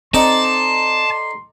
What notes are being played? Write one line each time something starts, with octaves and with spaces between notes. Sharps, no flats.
C4 D#4 A4 D5 A5 C6